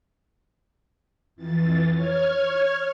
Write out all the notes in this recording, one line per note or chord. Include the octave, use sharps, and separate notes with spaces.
F2 E3 A6
C#5 F6 G#6